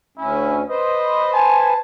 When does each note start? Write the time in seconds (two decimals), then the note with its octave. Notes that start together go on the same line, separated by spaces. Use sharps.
0.17 D2 C#4 E4
0.69 B4 C5 D#5
1.33 G#5 A5